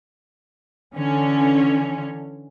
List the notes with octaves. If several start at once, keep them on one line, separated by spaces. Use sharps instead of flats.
D3 E3 C#4